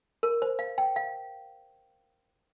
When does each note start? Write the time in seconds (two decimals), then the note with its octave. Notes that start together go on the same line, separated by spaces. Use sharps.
0.23 A#4
0.42 C5
0.59 F5
0.78 G5
0.96 F5